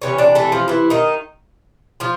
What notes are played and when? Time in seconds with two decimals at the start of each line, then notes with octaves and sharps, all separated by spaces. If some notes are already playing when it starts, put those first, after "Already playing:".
0.02 C3 E3 A3 C#4 C#5
0.18 D4 D5
0.35 A3 A4
0.52 F3 F4
0.68 E3 E4
0.90 D#3 D#4
2.00 F3 F4